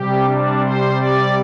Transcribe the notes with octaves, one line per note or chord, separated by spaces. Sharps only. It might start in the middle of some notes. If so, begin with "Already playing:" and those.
Already playing: C3 G3 G4
D4
C5
D5